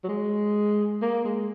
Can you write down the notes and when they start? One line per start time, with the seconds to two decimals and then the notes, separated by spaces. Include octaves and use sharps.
0.04 F#3
0.09 G#3
1.02 A#3
1.25 G#3